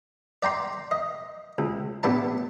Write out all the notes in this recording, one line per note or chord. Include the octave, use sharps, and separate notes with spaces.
D5 G5 A#5 C6
D#5
C#2
A1 B3 D4 A5